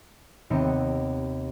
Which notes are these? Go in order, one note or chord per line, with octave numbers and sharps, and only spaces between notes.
D#2 C3 B3 C4 C#7